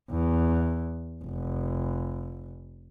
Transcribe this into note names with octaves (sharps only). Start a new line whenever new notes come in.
E2
F1